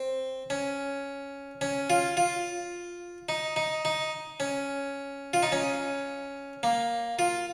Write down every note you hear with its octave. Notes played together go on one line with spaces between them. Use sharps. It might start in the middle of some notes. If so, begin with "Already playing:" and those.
Already playing: C4
C#4
C#4
F4
F4
D#4
D#4
D#4
C#4
F4
D#4
C#4
A#3
F4